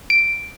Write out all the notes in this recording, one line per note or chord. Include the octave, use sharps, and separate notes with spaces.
D7